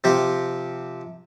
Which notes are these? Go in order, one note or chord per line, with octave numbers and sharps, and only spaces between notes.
C3 F3 G4